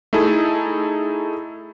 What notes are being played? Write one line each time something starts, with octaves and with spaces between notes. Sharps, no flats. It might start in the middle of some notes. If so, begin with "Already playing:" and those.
A3 D#4 E4 G#4 A4